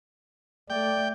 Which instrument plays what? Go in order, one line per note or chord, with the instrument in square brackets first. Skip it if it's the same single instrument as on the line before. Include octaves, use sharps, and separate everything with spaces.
[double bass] A3 [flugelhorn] D5 [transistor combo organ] G5